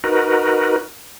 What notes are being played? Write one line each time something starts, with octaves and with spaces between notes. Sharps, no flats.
D#4 F#4 A#4 B4